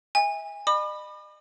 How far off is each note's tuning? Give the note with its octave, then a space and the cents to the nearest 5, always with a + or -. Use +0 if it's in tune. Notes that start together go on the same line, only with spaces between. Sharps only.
E5 -30 G#5 -25
D#5 -45 B5 +0 D6 +45